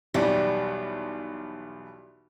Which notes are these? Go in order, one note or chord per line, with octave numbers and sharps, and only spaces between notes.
B1 E2 G3